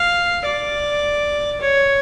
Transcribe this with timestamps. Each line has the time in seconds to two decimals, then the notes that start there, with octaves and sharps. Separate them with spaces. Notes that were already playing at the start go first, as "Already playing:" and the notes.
Already playing: F5
0.45 D5
1.61 C#5